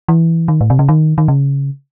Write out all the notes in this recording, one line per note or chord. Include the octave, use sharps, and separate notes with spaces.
E3
D#3
A2
C3
C#3
D#3
D#3
C#3